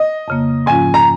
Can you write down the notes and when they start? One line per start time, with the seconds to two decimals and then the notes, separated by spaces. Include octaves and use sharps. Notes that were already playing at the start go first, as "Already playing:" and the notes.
Already playing: D#5
0.28 F2 C#3 A#3
0.66 G#2 F3 C#4 F4 G#5
0.94 A#5